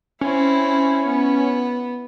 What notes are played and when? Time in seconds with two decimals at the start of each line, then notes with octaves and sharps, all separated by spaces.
0.21 C4 C#4 E4
1.06 B3